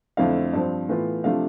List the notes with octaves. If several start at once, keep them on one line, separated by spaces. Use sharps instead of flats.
F2 D3 A3 C4 E4 F5
G2 F3 C4
A2 E3 B3 F4
C3 F3 A3 D4 F4 F5